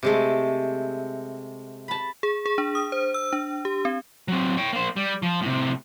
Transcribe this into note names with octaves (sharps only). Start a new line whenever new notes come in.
C3 G#3 A3
A5 B5
G#4
G#4
D4
D#6
C5
E6
D4
G4
C4
F#3 C4
C#5 G5
A#3 C5
G3
F3
A2 C3